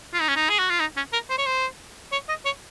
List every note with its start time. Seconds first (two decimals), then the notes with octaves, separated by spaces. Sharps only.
0.13 F4
0.21 D#4
0.28 C#4
0.36 D#4
0.49 G#4
0.59 F#4
0.70 F4
0.80 D#4
0.96 C#4
1.13 A#4
1.30 C5
1.38 C#5
1.46 C5
2.12 C#5
2.29 D#5
2.45 C#5